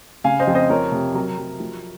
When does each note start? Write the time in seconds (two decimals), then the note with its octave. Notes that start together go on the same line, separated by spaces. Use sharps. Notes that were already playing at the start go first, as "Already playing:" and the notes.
0.24 C#3 F5 G#5
0.40 C5 D#5
0.47 F2
0.55 C5 D#5
0.69 F3 A#4 C#5
0.92 C3
1.14 F#3 A#4
1.38 F#3
1.60 F3